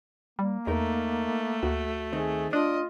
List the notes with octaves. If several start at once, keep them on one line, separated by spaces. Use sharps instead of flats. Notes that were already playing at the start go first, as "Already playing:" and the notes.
G3 A#3
E2 A3 D#4 A#4
D2 F#4
D#3 C4 G#4
D4 F4 D5 D#5